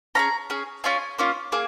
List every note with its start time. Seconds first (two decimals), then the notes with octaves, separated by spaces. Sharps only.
0.15 C#4 F4 A#5
0.19 G#4
0.50 C#4 G#4
0.84 C#4 F4 G#4 G#5
1.19 A#3 C#4 F4
1.52 A#3 G#4